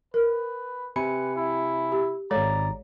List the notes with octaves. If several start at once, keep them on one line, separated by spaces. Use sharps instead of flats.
A#4 B4
C3 B4 G#5 B5 C#7
E4
G4
G#1 G#3 A4 C#5 D5 A#5